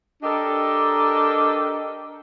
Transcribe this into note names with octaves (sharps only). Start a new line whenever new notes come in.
D4 G4 A4 A#4 D#5